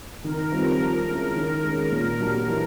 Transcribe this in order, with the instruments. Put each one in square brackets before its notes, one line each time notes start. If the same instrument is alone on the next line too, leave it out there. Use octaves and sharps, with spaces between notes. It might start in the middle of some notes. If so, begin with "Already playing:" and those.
[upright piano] D#3 [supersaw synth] A#4
[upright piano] G3 C4 F4
F3
G#3 C#4 E4
D#3
G#3 C#4
A#2
F#3 A#3 D4 G4
E3